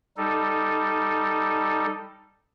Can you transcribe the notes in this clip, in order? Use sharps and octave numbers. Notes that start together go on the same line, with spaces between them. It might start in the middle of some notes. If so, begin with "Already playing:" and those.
G3 D#4 A4